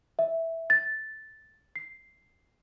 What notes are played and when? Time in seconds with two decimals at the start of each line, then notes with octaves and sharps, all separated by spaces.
0.19 E5
0.70 A6
1.76 C7